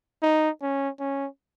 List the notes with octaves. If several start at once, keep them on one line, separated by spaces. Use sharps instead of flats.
D#4
C#4
C#4